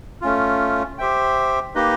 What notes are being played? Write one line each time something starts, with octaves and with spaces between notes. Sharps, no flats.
A3 C#4 F4
G4 C5 E5 G5
A#3 D#4 G4 B4 D#5